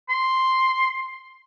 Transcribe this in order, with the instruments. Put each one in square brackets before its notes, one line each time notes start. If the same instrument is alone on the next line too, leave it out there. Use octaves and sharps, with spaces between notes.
[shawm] C6